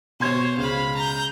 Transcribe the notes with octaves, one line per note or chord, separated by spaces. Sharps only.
B2 C5 C#5 C6 G#6
C#2 F5 B5
A#5 G6